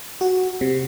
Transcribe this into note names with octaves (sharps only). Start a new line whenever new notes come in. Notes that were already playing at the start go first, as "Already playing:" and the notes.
F#4
C3